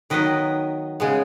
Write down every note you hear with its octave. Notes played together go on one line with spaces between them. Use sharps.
D#3 F#3 B3 B4 D#5
C#3 G#3 B3